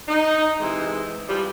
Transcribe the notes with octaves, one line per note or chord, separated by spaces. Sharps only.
D#4
C3 E3 G#3
E3 F3 G3